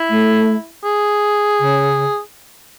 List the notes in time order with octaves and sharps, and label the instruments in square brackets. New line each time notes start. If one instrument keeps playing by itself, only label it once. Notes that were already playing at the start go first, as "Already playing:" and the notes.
Already playing: [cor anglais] E4
[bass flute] A3
[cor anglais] G#4
[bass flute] C#3